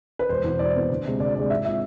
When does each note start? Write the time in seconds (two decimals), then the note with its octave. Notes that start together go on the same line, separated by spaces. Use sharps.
0.19 B4
0.29 E1 C5
0.44 E2 B2 B3
0.59 E1 D5
0.75 E2 B2 B3
0.90 D2
1.05 C3 G#3
1.20 D2 D5
1.35 C3 G#3 D5
1.50 G#1 E5
1.65 G#3 C4 F4 E5